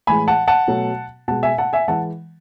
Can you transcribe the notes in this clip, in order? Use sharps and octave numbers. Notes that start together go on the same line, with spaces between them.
A2 E3 G#3 G#5 B5
F#5 A5
F#5 A5
B2 F#3 A3
B2 G#3 F#5 A5
E5 G#5
F#5 A5
E5 G#5
E3 G#3 F#5 A5